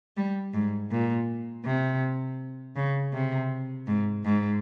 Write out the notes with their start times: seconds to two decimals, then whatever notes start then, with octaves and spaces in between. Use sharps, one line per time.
0.17 G3
0.54 G#2
0.91 A#2
1.65 C3
2.76 C#3
3.13 C3
3.87 G#2
4.24 G#2